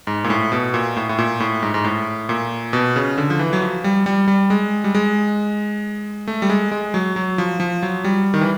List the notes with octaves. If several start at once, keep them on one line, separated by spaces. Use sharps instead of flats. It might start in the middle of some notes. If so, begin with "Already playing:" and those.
G#2
A#2
A2
B2
A#2
A2
A2
A#2
A2
G#2
G#2
A2
A#2
B2
C#3
D3
F3
E3
F#3
F3
G3
G3
G3
G#3
G3
G#3
A3
G3
G#3
G#3
F#3
F#3
F3
F3
F#3
G3
D#3
E3